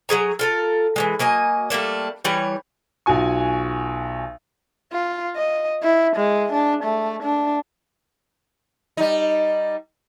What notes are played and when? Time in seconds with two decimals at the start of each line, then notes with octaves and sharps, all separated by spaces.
0.09 F#3 G4 G#4 A#5
0.39 F4 A4 A#4
0.96 E3 F#3 G#3
1.19 F#3 A#3 D#5 G#5
1.70 G3 A3 A#3 D4
2.25 E3 G3 C#5
3.06 B1 F4 F#4 G#5 C#6
4.93 F4
5.36 D#5
5.83 E4
6.16 G#3
6.53 D4
6.84 A3
7.24 D4
8.97 G3 D#4